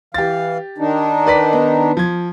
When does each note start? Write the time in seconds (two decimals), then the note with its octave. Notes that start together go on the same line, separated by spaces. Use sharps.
0.14 E3 G4 F5 A6
0.78 D#3 D4 D#4
1.26 B4 D5 B6
1.53 B3
1.97 F3 G#6